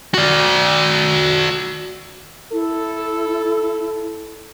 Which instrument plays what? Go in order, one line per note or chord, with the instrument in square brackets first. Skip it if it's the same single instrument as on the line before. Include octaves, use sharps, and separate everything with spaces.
[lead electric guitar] F#4 D5
[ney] E4 [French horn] A4